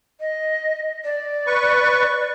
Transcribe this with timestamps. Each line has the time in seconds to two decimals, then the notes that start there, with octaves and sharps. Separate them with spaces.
0.21 D#5
1.04 D5
1.47 B4 C#6